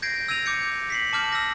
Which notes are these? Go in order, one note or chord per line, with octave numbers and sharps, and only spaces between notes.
G6 G#6 A#6 C7 D7
E6 G#6 A#6 D#7 F7
D6 G6 C#7
B6 C7 F#7
A5 D6 F6 G6 F#7
E6 A#6